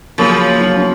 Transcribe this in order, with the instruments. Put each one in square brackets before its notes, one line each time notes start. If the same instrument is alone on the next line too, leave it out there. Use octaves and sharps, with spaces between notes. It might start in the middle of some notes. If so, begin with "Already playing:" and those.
[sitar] C#3 F3 [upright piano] F#3 A#3
[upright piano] F#3
C#4